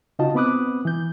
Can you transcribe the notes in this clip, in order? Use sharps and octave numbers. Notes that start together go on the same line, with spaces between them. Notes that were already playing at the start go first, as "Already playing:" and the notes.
C#3 D#4 F4 F#4 D#5 A5
B3 C4 B5 D6 D#6 F#6
E3 G6